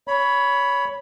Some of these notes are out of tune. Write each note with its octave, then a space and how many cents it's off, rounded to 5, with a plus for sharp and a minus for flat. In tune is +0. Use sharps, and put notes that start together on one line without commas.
C#5 +20 B5 +0